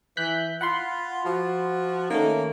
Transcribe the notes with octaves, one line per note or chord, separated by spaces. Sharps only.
E3 F#6 G6 B6
F4 F#5 B5 C6
F3 F#4
D#3 A3 A#3 C#4